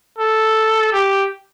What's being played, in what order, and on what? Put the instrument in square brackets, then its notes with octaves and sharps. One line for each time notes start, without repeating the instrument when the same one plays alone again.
[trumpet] A4
G4